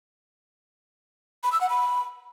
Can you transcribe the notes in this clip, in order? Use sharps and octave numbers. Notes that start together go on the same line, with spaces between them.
B5
E6
F#5
B5